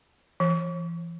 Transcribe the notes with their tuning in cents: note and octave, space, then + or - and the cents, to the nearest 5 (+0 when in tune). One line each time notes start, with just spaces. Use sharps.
E3 +35